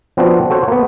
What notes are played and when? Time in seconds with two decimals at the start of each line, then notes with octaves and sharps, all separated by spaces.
0.17 F3 B3 C4 D4 F#4
0.50 F#4 A4 C5 C#5
0.68 A#3 B3